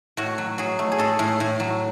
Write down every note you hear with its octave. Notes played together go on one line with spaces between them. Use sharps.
A2 F#4
F#3
F#3 G#4
A3
G#4
A2 A4
A2
A2
F#3